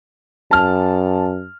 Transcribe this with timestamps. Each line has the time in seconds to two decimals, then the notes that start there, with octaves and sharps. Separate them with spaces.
0.51 F#2 A5 F6